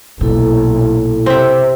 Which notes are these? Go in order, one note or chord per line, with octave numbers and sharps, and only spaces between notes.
B1 A#2 E4 A4
C3 C4 E5